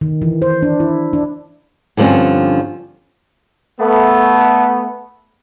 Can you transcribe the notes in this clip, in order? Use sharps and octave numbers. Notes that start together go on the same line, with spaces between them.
D#3
E3
C5
D4
E4
D4
G2 D3 F3 C4 C#4
A3 B3